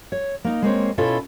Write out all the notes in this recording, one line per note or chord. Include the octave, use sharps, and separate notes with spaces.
C#5
A#3 D#4
G#3 A#3 C4 C#5
B2 C#4 E4 F4 A4 C#5